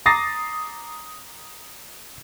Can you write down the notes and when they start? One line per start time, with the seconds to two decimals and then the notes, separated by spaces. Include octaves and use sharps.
0.06 A#5 D6 D#6 A6 A#6 C7